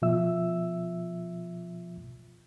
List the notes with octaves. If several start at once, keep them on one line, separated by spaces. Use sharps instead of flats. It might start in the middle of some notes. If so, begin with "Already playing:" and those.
B2 F3 F4 E5 E6